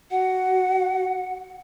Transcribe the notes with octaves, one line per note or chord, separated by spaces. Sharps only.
F#4 F#5